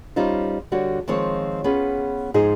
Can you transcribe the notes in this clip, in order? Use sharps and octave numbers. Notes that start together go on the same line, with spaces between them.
G3 C#4 D#4 F4 C5
D3 G3 F#4 C#5
D#3 F3 G#3 C4 C#5
B3 C#4 F4 G#4
G#2 F3 D#4 G#4